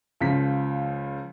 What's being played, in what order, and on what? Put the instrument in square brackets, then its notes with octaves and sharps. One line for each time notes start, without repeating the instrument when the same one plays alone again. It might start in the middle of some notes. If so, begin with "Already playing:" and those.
[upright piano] C#2 F3 B6